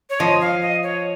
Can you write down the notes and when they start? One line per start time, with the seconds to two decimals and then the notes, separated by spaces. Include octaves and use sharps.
0.10 C#5
0.20 F3 D#5
0.41 F5
0.62 D#5
0.83 C#5